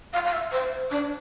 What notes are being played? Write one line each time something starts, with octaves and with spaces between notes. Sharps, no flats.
F5
F5
E5
C5
D4